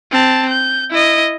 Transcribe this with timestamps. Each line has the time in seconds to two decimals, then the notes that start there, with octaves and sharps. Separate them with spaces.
0.11 C4 A5
0.49 G6
0.91 E4 D#5